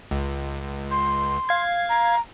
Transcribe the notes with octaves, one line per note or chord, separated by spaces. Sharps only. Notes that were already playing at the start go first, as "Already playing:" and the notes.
C#2
C6
F5 G#6
A#5